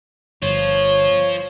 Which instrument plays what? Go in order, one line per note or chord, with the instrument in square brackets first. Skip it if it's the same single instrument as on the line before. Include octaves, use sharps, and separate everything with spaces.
[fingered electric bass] G1 [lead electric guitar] F3 F4 [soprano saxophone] C#5